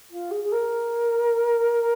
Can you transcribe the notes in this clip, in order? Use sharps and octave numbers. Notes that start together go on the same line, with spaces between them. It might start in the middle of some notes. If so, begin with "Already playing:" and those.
F4
G#4
G#4
A#4